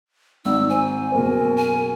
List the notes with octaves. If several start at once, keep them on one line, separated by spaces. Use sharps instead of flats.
G#1 D#4 E6
C5 G#5
F#1 B2 A#4
G#5